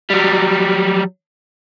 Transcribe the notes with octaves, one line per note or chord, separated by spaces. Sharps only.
F#3 G3